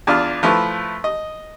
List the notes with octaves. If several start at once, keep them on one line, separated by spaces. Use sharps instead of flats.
E2 D4 F4 F6
F3 A3 E4 B4
D#5